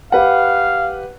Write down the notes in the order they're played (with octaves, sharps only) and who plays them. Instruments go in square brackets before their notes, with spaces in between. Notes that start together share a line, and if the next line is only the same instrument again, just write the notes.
[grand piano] G4 B4 F#5 [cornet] F5